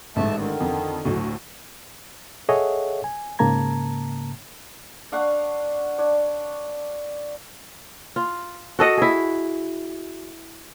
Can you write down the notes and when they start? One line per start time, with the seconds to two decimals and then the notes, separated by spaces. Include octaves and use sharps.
0.16 A1 G#2 A3 E5 A5
0.36 D3 D#3
0.60 F2
1.05 D2 A2 F#3
2.49 G#4 A4 C#5 D#5 E5 F#5
3.04 G#5
3.39 G#2 C#3 A#3 A5 A#5 G#6
5.12 D4 F5 F#5 C#6
5.98 D4 C#5
8.16 F4
8.79 F#4 A4 D#5 F#5
8.97 E4 G#4